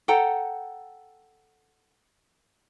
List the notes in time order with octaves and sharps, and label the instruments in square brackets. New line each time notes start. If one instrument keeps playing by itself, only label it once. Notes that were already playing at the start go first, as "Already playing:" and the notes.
[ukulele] A4 F#5 G5 A#5